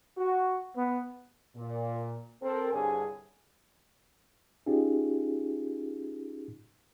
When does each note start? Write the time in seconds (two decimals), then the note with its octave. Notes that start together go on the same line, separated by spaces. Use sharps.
0.17 F#4
0.76 B3
1.56 A#2
2.42 C4 A4 A#4
2.72 C2 G2 D3 G#4 C#5 G#5
4.66 C#4 D#4 F4 G4 G#4